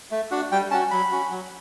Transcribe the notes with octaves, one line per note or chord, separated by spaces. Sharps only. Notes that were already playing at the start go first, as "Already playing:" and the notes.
A3
D4 F#4
G3 G5
C#4 F#4 A5
F#3 B5
C#4 F#4
F#3